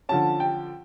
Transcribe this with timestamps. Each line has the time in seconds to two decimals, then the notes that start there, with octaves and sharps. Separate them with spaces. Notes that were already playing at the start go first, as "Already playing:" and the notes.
0.09 D3 F3 C#4 A5
0.40 G5